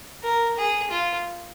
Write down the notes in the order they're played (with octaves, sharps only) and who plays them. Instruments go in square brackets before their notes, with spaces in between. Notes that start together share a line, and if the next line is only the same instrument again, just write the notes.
[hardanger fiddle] A#4
G#4
F4